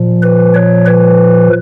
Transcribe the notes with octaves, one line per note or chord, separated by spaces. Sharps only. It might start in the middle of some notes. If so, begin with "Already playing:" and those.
Already playing: A#2 F3
B4
C#5
B4